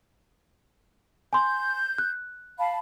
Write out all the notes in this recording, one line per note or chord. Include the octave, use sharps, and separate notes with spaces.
G#5 C6 G6
F#6
F5 A5 B5